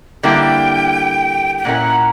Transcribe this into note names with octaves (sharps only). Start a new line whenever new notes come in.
D3 G3 A#3 E4 G4 G5
G5
A#2 G3 C#4 E4 A#4 F#5